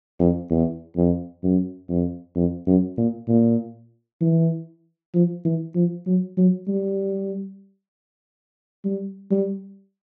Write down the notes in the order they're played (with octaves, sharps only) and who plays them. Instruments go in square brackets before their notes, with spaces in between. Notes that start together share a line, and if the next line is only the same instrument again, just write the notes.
[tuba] F2
E2
F2
F#2
F2
F2
F#2
A#2
A#2
E3
F3
E3
F3
F#3
F#3
G3
G3
G3